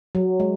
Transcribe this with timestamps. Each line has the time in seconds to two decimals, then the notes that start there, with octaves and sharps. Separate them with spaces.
0.15 F#3
0.40 G#3